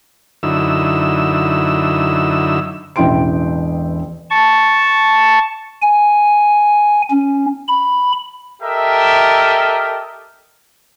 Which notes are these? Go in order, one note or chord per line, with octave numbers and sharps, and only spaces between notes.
F#2 D3 D#4 E4 E6
E1 A1 E4 G5 C6 D7
A5 C#6
G#5
C#4
B5
G4 A4 A#4 D#5 E5